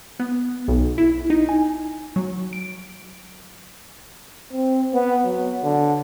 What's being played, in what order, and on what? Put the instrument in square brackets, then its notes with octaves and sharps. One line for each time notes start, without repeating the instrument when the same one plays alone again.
[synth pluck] B3
B1
E4
D#4
G#5
F#3
D7
[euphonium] C4
B3
F#3
D3